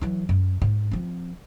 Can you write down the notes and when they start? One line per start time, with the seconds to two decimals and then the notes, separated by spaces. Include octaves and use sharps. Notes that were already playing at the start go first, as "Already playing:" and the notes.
0.01 E3 F#3
0.29 F#2
0.62 G#2
0.91 F3 C4